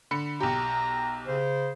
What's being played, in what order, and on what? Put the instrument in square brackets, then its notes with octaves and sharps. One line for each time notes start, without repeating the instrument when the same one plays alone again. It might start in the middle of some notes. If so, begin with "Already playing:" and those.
[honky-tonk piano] D3 B5 C#7
[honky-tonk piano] B1 G4 [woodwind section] A#5
[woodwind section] C#3 C5